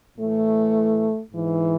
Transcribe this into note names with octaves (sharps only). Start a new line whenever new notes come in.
A2 E3 A3
G#2 E3